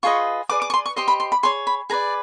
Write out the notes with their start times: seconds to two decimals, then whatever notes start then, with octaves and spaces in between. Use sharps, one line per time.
0.03 F4 G#4 B4 D#5 C#6
0.49 G#4 B4 D5 D6
0.62 D6
0.70 C#6
0.74 C6
0.86 C#6
0.96 G4 C5 D#5 C6
1.08 B5
1.20 C6
1.32 B5
1.43 G#4 C#5 C6
1.67 B5
1.90 G#4 B4 D5 A#5